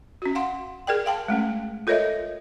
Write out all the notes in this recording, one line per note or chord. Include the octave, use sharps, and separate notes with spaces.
C#4 F#4
F5 F#5 C6
G#4 A#4 D5 G5
F5 G5 A5
G#3 A3 C#4
F4 A4 A#4 C#5 D#5 E5